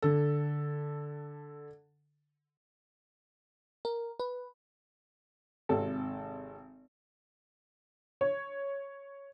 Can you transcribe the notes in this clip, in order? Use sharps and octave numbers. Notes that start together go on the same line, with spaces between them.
D3 A4
A#4
B4
G#1 C3 A4
C#5